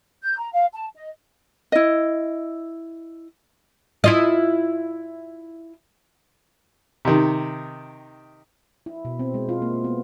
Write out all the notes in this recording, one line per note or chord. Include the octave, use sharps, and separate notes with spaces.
G6
A#5
F5
A5
D#5
E4 D#5
E4 F4 D#5
C3 D#3
E4
B2
C4
G#3
F4
A#3
B3